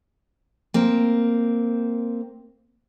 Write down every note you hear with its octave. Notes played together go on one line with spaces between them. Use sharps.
A#3 C4